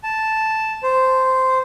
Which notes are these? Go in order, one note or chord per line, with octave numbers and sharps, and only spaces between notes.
A5
C5